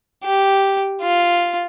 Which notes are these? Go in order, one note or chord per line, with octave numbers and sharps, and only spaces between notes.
G4
F4